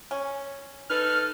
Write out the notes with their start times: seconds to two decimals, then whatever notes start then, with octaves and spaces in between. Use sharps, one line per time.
0.11 C#4
0.90 D#4 A4 B4 F6